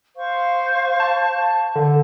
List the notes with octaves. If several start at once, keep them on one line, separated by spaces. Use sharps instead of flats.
C5 F5 C#6
A5
D3